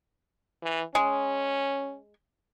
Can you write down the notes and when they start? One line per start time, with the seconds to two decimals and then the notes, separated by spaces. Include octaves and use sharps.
0.63 E3
0.95 G#3 C#4